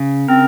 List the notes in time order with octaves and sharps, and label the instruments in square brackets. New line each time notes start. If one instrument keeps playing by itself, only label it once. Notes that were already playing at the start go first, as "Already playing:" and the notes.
Already playing: [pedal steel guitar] C#3
[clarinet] C4 [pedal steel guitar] A#4